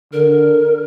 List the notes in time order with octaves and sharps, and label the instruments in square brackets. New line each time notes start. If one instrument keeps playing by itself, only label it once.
[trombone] D3 [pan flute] A#4